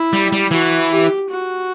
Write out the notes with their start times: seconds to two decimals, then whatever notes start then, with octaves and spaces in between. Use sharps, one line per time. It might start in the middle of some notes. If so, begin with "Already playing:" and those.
Already playing: E4
0.13 G3
0.32 G3
0.51 E3 F#4
0.91 G4
1.30 F#4